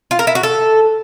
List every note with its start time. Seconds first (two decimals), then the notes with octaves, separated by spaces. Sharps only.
0.11 F4
0.19 A#4
0.27 E4
0.35 F#4
0.43 A4